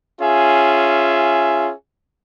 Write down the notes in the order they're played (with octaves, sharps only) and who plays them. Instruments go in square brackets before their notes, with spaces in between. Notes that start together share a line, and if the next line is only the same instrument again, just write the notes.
[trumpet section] C#4 F4 G#4 E5